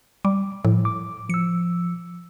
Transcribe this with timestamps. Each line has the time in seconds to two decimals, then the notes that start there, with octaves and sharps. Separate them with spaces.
0.25 G3 D6
0.65 A2 F3
0.85 D6
1.30 F3 E6 C#7